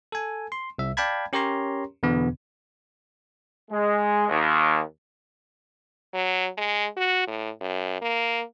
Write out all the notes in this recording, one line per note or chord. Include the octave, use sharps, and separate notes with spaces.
A4 G#5
C6
C2 E5
D5 F5 G5 A5 B5 G#6
C#4 G4 A#4 C#5 A#5 C6
E2 B2 D3 B3
G#3
D#2
F#3
G#3
F#4
A2
F#2
A#3